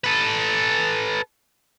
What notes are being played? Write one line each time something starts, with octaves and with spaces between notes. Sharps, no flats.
A4 B4